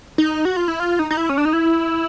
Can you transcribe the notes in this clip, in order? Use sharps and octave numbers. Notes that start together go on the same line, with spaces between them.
D#4
F#4
F4
E4
F4
D#4
D#4
E4
C#4
D4
D#4
E4